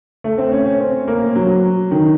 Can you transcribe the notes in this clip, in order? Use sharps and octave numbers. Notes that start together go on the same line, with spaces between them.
A3
C4
C#4
C#4
C4
A#3
F#3
D#3